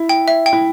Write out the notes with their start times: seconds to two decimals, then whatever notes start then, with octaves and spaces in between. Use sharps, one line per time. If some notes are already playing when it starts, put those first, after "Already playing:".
Already playing: E4
0.09 G5
0.28 E5
0.46 G5
0.53 E4